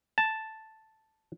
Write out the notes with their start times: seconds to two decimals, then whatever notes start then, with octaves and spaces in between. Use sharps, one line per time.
0.18 A5